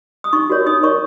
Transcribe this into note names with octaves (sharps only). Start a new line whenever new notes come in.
D#6
D#4 C#6
F#4 A#4 C#5
D#4 D#6
A#4 C#5 C#6